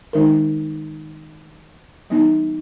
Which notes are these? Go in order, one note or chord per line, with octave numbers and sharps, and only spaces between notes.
D#3 G#3 D#4 A#4
E3 G3 B3 D#4